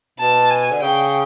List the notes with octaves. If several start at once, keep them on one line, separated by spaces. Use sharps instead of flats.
B2 A5
G#5
D3
C#3 G5